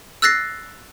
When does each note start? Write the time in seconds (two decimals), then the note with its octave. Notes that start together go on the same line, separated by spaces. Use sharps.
0.22 E6 F#6 A6 A#6 C7